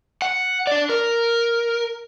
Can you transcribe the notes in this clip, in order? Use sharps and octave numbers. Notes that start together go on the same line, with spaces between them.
F#5
D4 D5
A#4